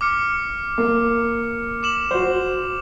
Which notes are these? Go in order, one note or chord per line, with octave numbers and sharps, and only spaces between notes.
D6 F6 C#7
A#3
D6 E7 F#7
F#4 C5